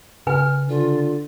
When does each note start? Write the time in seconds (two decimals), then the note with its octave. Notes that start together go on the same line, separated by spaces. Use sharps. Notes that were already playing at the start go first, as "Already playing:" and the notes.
0.27 C#3 B4 G#5 F6
0.69 D3 F4